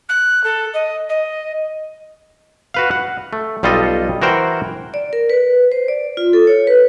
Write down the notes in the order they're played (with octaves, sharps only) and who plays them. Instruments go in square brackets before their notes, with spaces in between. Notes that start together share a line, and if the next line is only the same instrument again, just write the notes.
[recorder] F#6
A4
D#5
D#5
[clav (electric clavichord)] F#4 B4 F5
F#5
A3
B1 G3 F4 A4 D#5
E3 F#4 A#4 C5 F#5 G5
[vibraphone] D5
A#4
B4
C5
D5
F4
A4
C#5
B4